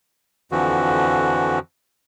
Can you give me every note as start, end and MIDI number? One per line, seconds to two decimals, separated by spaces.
0.52 1.59 41
0.52 1.59 50
0.52 1.59 52
0.52 1.59 53
0.52 1.59 66